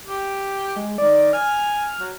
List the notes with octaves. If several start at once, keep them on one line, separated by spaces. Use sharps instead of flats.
G4
G#3
D#3 D5
G#5 F6
F#3